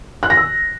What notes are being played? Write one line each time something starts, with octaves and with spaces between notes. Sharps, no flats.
F#6
A#6
E6